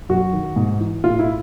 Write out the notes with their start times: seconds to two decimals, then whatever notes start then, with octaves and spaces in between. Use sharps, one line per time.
0.09 F#2 F#4
0.33 D#3
0.56 G#2
0.80 E3
1.04 A2 F4
1.19 E4